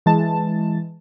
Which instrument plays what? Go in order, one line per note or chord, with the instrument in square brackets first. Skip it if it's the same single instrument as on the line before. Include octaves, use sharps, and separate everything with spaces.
[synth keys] E3 G#3 A5